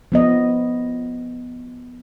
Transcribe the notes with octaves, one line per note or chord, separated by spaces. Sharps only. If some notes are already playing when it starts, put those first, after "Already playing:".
F3 B3 D#5